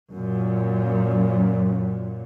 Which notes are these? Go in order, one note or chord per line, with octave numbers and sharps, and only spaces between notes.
F#2 A#2